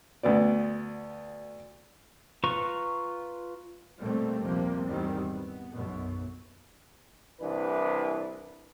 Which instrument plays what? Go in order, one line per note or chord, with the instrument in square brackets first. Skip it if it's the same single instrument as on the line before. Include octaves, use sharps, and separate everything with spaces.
[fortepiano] D2 B3 D5
[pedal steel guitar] F4 B4 A#5 C#6
[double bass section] B2 G3 A3 A#3 C4
A#1 D#2 C3 F3 G3 A#3
E2 G#2 D#3 G3 C4
B3
B1 F#2 B2
[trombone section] C2 E3 D4 B4